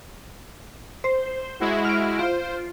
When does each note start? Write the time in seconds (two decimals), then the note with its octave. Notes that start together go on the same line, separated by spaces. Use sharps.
1.04 C5
1.60 G#3 E4 F#4
1.85 F6 D7
2.19 F4 C5